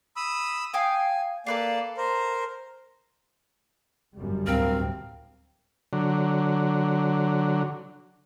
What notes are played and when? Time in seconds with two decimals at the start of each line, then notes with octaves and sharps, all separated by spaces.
0.17 B5 D#6 E6
0.74 F5 G5 G#5 D#6
1.47 A#3 A4 B4 D5 F5
1.97 A#4 C5
4.16 G1 F#2 G3
4.46 D2 A2 C4 A#4 F5
5.93 D3 F#3